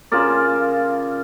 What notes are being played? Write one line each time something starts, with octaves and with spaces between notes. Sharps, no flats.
C#3 F4 A#4 D5